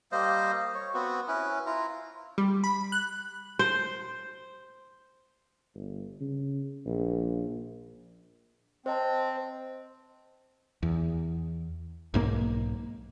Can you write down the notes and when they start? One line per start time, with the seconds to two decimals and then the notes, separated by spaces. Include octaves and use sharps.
0.12 G3 A#3 C5 D#5
0.74 C#5
0.94 B3 C4 F#4
1.28 C#4 E4 B4
1.66 E4 F4 A#5
2.38 G3
2.64 B5
2.92 F#6
3.59 C5
5.75 G1
6.21 C#3
6.86 A#1
8.86 C4 C5 D#5 A5
10.83 E2
12.14 B1 G#2 A#3